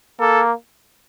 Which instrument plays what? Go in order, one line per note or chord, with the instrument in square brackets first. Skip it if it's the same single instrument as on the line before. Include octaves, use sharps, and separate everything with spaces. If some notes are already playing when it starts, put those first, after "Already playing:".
[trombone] A#3 [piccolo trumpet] A4